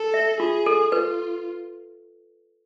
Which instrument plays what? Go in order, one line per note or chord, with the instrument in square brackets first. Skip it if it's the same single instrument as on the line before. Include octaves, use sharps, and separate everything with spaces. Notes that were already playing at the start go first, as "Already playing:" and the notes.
Already playing: [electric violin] A4
[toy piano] E5
[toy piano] F4 [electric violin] G#4
[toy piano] A4
[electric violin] F4 [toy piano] B4